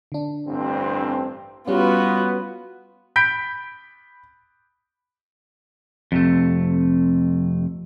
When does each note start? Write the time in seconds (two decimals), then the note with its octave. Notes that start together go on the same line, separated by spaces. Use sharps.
0.12 D3 D4
0.47 A1 G2 C4
1.68 G3 B3 C#4 F4 F#4
3.16 B5 G6 B6 D7
6.12 F2 C3 A3